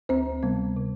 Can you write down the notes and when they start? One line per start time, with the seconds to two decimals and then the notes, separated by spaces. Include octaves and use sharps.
0.09 D2 C4 C5
0.43 C3 G3 B3
0.77 C3